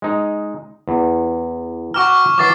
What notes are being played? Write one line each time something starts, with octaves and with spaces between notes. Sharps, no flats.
G#3 D#4
E2
F#4 G5 A#5 C#6 D6 F6
E3 F#3 D6 A6 C7